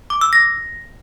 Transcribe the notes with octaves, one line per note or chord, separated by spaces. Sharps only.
D6
E6
A#6